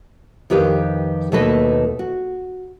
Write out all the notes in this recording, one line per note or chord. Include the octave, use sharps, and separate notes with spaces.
F2 D#3 G4 B4 C#5 F5
D#2 B2 A3 A4 B4 D#5
F#4